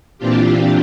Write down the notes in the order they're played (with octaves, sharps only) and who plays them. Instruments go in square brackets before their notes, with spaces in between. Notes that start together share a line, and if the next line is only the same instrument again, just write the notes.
[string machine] A#2 E3 C4 D4 F4 G4